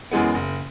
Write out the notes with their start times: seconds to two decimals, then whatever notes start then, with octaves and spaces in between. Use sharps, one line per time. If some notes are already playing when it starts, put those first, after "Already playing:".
0.11 F#2 E3 G#3 B3
0.34 F#1